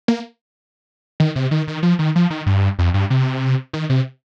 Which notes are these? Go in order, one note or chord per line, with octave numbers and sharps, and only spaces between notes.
A#3
D#3
C3
D#3
D#3
F3
D#3
F3
D#3
G2
F2
G2
C3
D#3
C3